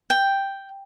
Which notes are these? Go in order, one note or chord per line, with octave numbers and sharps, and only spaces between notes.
G5